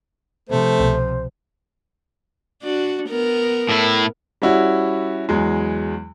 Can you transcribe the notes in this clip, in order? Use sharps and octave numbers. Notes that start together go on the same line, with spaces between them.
C3 F3 A3 C5
C2 B2
D4 F#4
B3 A#4
A2 E4
G3 C#4 E4 F#4
E2 F#3 G#3